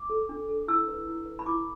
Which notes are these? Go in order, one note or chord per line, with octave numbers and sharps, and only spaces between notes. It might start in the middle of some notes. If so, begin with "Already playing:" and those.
Already playing: D6
A4
D4
A4
E4 E6
B4
E4
B4
B5
E4 D6